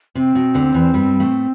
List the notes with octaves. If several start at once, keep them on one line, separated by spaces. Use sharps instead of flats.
C3 C4
B2
D2 D3
E2 E3
G2 G3
A2 A3